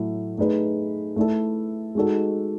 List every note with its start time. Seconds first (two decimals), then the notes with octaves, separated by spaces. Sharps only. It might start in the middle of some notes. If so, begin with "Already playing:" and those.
Already playing: A2 F#3 A3 E4
0.38 A3 D#4 G#4 B4
1.16 A3 E4 A4
1.95 G#3 D#4 F#4 A4